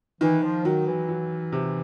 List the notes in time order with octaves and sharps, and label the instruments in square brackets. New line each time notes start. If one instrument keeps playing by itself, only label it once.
[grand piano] D#3 [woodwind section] E3
[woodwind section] F3
[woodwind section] D#3 [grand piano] F#3
[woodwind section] E3
[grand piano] F#3
C3